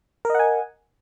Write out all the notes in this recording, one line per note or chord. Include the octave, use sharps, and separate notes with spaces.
A#4 D#5 F#5 G#5